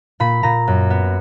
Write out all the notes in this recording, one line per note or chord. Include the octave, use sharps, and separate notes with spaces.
A#2 B5
A#2 A#5
F#2
B3